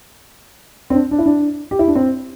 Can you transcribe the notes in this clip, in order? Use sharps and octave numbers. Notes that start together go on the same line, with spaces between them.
C4
D4
D4
E4
D4
G4
E4
D4
C4